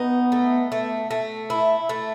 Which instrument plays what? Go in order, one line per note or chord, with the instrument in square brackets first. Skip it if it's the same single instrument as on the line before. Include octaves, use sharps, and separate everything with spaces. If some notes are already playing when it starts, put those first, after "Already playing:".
Already playing: [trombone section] B3 [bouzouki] D#4
[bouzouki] A3
A3
A3
E4
A3